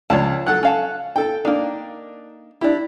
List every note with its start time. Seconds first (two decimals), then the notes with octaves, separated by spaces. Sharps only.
0.10 C#2 F3 C#5 D5 A5
0.47 F#3 A4 F#5 F#6
0.63 C#4 F5 A5
1.16 A4 G5
1.45 A#3 D4 D#4
2.61 D4 E4 G4